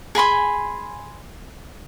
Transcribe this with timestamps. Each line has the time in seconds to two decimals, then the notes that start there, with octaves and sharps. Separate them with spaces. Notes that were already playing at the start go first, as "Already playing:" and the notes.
0.15 G#4 G#5 B5 C6